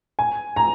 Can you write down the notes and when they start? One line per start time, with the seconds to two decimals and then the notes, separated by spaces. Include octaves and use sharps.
0.19 G#5
0.56 A#5